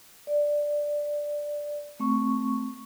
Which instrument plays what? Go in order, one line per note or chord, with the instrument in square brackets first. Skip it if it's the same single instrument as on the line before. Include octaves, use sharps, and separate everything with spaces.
[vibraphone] D5
A3 C4 C#6